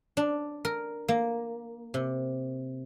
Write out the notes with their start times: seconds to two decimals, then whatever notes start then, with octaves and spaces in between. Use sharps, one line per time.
0.17 D4
0.65 A#4
1.08 A#3
1.94 C3